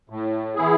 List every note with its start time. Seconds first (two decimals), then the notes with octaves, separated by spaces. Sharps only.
0.10 A2
0.55 E3 B3 E4 G#4